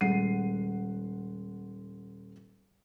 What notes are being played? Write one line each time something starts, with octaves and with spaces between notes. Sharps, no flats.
D#1 G#3 F#5 C7 D#7